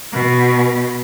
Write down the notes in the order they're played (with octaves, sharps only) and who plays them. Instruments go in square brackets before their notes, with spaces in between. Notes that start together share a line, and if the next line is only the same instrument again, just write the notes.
[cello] B2